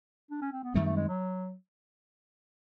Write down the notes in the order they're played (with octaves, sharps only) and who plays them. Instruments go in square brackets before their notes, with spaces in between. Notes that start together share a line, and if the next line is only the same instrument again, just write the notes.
[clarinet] D4
C#4
C4
B3
[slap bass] F#2 D#3 G3 C4 [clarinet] A3
[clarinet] A3
G#3
F#3